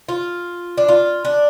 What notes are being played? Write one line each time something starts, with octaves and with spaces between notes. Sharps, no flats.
F4
D4
F4
D4